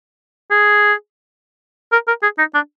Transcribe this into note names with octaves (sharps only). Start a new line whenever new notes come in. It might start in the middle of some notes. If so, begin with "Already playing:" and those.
G#4
A#4
A#4
G#4
D#4
D4